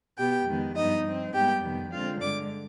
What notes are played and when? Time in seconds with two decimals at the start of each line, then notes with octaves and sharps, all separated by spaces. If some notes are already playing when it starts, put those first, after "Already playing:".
0.18 B2 B3 G4 G5
0.47 F2 D#3 G#3 B3
0.76 G2 F3 B3 D#4 D#5
1.05 G2 F3 C4
1.33 G#2 G3 B3 G4 G5
1.62 F2 C3 D#3 G3 B3
1.91 D3 G#3 C4 F4 F5
2.20 G2 D3 G#3 D5 D6